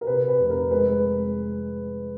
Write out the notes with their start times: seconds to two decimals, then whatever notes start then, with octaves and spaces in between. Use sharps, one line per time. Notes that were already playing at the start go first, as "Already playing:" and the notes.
0.01 A#4
0.07 C3 B4
0.28 B4
0.39 F1
0.50 A#4
0.71 G#3 B4